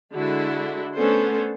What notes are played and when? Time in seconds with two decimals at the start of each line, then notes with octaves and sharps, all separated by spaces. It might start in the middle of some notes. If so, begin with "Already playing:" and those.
0.14 D3 G#3 E4 F#4
0.96 A3 B3 C#4 D4 A4 C5